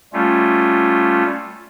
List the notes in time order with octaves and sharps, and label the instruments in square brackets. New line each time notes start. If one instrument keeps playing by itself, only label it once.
[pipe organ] G3 A3 C#4 F4